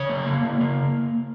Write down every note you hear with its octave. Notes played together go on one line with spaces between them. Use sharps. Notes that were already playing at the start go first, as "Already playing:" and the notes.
Already playing: C#3 C#5
A#3
A#3
C#3
A#3